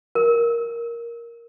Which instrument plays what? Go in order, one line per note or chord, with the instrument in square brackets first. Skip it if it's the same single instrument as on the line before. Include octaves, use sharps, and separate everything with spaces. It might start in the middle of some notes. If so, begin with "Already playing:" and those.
[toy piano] A#4